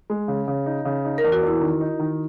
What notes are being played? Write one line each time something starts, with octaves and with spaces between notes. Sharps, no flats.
G#3
C#3
C#3
D#4
C#3
D#4
A#4
E2
F#4
E2 E4
D#3
D#4
D#3